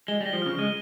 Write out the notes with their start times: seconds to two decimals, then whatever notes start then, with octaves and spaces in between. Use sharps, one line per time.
0.08 G#3 G7
0.21 G3
0.26 A#6
0.33 F3
0.42 C#3 F6
0.59 G#3 D#7